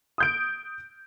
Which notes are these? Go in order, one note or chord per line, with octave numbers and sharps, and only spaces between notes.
D#6 G6 D7